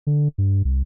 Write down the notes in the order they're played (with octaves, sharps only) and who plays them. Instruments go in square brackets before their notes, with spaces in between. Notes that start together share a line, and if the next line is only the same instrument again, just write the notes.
[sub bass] D3
G2
C2